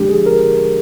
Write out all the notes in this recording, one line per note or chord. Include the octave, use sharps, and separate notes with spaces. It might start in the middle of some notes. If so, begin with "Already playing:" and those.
Already playing: A#2 F3 G#3 D4 G4
G#4
A#4